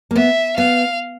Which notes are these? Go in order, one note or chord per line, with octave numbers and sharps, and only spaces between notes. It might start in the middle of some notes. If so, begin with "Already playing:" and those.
A#3
B3 E5
B3 F5